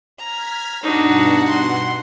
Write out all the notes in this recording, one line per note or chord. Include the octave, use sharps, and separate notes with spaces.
A#5 F6 G#6 B6
G2 B2 D4 D#4 F#4 F#5
C6